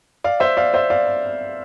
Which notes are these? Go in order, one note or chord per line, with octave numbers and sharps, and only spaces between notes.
D5 F5
C5 E5
D5 F5
C5 E5
D5 F5